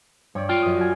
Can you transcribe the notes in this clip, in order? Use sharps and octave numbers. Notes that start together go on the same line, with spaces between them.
G2 C#5 D5
F4 G5
F#2 D#6
F#4 G#5